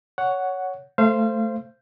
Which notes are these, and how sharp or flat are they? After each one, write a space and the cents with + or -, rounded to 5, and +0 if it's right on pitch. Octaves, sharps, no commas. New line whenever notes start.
C#5 +10 F#5 +0
A3 +0 C5 +0 F5 -30